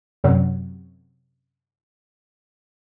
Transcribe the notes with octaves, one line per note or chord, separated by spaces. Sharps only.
F#2 C3 F#3